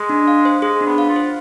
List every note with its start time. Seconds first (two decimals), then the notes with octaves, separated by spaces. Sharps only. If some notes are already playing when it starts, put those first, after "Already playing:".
Already playing: G#3 G#4
0.09 D4
0.27 F5
0.45 C5
0.62 G#3 G#4
0.81 D4
0.86 B3
0.98 F5
1.09 F4
1.16 C5